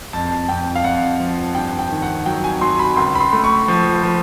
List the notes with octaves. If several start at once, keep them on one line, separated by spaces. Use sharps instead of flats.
F2 A5
F2 G5
F5
F2 F#5
F3
G2 G5
G5
D#3
F#5
F#3 G5
G#5
F#3 C6
B5
C#2 C6
B5
C6
A3
C#6
F3
F3